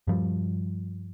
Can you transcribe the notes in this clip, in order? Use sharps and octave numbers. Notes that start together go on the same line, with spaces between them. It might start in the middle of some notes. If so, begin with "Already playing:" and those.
G2 F3 G3